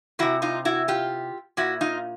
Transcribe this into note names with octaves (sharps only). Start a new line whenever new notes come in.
C3 D#3 E4 F#4
D#4 F4
E4 F#4
F4 G4
A#2 E4 F#4
D#4 F4